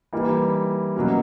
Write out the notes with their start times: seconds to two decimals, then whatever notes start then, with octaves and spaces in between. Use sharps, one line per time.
0.13 E3 G3 A#3 D#4
0.96 B2 F#3 A#3 C#4 F#4